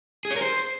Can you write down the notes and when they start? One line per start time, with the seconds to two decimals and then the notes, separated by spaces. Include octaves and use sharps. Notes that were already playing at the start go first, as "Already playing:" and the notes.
0.25 G#4
0.31 C#5
0.36 A#4
0.42 C5